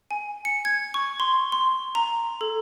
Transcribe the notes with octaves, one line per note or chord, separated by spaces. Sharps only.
G#5
C#7
G#6
C#6
C6
C6
A#5
A4